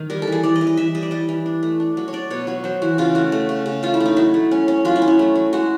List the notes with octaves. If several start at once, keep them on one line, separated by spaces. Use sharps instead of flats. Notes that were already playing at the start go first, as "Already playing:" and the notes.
Already playing: D#3 D#4
G3 A#4
A4
E3 G#4
E3 D5
D#5
E3
D#5
E3 E5
G3 D#5
D5
G3 D#5
E3
D4
A3
D4
F#3
C#5
D4 D5
B2 C#5
F#3 C#5
F#3 C5
E3 F#4
C#3 F4
A3 F#4
A3
C#3
C#3
A3 F4
E4
A3
D#4
F#3 E4
A3
C#4
C#4
F#3 F4
E4
C#4
E4
A3
F#3
G#3 F#4